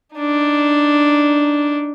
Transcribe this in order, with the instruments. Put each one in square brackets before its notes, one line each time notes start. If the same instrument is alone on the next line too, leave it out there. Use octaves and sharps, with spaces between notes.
[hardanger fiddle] D4 D#4